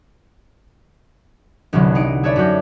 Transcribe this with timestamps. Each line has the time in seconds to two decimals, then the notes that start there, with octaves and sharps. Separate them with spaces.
1.73 G1 C2 C3 E3 F#3
1.95 D#4 D#5 F#5 D#6 D7
2.23 G#4 A4 B4 C#5 D5 E5
2.36 F#2 F#3 F#4 G6